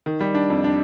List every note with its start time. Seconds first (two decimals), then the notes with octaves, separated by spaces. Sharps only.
0.06 D#3
0.21 G3
0.35 D4
0.50 F2
0.64 D4